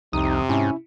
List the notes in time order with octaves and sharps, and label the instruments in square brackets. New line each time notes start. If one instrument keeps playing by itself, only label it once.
[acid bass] C2 [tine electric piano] F2 D#6 [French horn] C3 [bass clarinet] D#4
[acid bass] G#2 [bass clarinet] C#4 [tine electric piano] E4